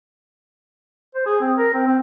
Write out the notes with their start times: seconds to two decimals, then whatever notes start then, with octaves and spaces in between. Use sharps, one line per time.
1.15 C5
1.26 G#4
1.41 C4
1.57 A#4
1.74 C4
1.87 C4